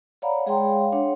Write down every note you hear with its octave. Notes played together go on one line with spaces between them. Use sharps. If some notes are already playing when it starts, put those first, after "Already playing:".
C#5 D5 F5 F#5 A#5 B5
G#3 G#4 C#5 F5 G5 C6
D4 C#5 F#5